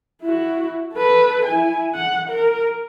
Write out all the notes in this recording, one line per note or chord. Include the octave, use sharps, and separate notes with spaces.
E4 F#4
A4 B4
E4 G#5
F#5
A#4